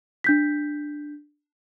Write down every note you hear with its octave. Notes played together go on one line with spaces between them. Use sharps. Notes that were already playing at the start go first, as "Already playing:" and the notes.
D4 G6 B6